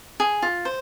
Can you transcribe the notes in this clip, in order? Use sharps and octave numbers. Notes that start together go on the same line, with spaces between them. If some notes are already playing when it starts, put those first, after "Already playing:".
G#4
F4
C5